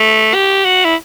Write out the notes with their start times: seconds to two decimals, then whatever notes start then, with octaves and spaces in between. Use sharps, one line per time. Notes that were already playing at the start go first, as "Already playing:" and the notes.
Already playing: A3
0.34 G4
0.65 F#4
0.85 E4